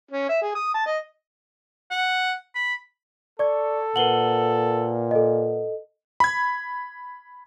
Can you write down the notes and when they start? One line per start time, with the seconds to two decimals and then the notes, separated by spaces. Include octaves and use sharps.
0.11 C#4
0.29 E5
0.42 G#4
0.55 D#6
0.74 A5
0.86 D#5
1.91 F#5
2.55 B5
3.39 A4 D5 C#6 D6 G#6
3.96 A#2 A#4 B4 F#5 F#7 G7
5.11 A4 D#5
6.20 B5 G#6